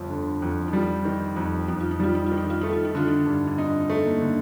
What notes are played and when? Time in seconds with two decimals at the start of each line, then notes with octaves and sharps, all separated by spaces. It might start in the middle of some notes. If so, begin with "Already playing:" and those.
Already playing: G1 F2 F3
0.10 D3
0.42 F2
0.68 D#4
0.73 G3 F4
1.05 D#3
1.36 F2
1.68 F2 D#4
1.80 F4
1.91 D#4
2.00 G3 F4
2.15 D#4
2.26 F4
2.32 D#3
2.38 D#4
2.50 F4
2.61 A3 D#4
2.73 F4
2.85 D#4
2.95 D3 F4
3.08 D#4
3.26 G2
3.47 D4
3.58 C4 D#4
3.90 A3
4.06 A#3
4.21 D3